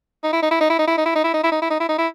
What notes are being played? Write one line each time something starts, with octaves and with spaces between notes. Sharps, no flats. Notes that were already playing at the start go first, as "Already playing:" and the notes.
D#4
E4
D#4
E4
D#4
E4
D#4
E4
D#4
E4
D#4
E4
D#4
E4
D#4
E4
D#4
E4
D#4
E4